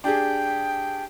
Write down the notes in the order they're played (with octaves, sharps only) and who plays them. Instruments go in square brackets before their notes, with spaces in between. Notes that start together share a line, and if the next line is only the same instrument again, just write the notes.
[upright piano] D4 G4 G#4 [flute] G5